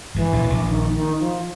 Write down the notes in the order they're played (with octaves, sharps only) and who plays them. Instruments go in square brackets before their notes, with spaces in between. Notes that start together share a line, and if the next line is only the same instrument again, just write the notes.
[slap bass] G#1 G#2 [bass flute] E3
[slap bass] A#1 A#2
B2
A#1 A#2
[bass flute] D#3
D#3
F3